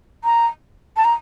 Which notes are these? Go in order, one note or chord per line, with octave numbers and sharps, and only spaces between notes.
A#5
A5
A#5